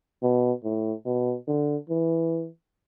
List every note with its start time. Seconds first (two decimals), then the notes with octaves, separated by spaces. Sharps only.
0.23 B2
0.64 A2
1.06 B2
1.47 D3
1.89 E3